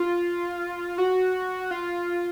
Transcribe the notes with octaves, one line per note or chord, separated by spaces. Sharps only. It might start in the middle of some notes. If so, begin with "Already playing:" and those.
Already playing: F4
F#4
F4